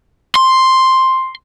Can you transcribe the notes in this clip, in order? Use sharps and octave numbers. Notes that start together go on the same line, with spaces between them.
C6